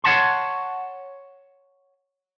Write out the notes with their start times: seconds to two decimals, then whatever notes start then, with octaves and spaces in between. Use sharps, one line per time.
0.04 C#5 F#5 A5 C6